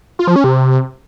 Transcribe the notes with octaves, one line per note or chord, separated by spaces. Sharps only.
F4
F3
C#4
C3